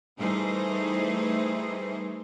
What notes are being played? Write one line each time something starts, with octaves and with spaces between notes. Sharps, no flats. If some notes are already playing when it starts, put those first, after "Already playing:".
E3 G3 A3 D#4 G#4 C5